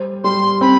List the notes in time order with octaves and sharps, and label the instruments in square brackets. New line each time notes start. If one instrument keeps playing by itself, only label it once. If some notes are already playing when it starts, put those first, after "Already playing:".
Already playing: [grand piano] G3 C5
[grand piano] G3 [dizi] C6
[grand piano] C4 [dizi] B5